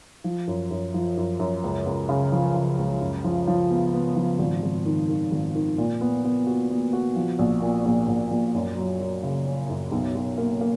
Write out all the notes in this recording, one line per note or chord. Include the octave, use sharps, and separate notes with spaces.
F3
F#2
F#2
F3
F#2
F#2
C#2
C#2
C#3
F3
C#3
C#2
F#2
F3
F3
B3
B3
F3
G#1
G#1
D#3
D#3
G#1
D#3
A#2
B3
B3
F#4
B3
F#4
F3
A#1
A#2
A#1
A#1
A#1
F#2
F#3
F#3
C#3
C#4
F#2
B1
B1
A#3
A#3